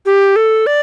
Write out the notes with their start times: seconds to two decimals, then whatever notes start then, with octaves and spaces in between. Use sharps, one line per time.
0.06 G4
0.36 A4
0.67 D5